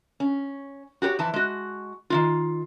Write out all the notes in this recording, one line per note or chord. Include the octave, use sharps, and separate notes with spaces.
C#4
F#4 G4 B4 C#5
F2 E3 A5
G#3 F#4
D#3 A3 F4